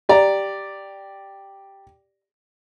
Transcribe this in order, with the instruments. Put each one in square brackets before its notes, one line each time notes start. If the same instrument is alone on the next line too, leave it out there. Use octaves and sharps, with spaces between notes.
[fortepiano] G4 D5 A#5